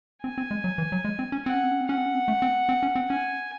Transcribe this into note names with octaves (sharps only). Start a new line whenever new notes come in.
C4 G#5
C4
G#3
F#3
E3
F#3
G#3
C4
C#4
C4 F#5
C#4
C4
C#4
C4
C#4 F#5
C4
C#4
C4
A3
C4
C4
C#4
C4
C#4 G#5